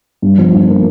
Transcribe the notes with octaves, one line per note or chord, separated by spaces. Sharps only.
G2
F3
D3
A#3